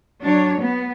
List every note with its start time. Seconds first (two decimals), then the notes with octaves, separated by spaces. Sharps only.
0.21 F#3 D4 C#5
0.59 B3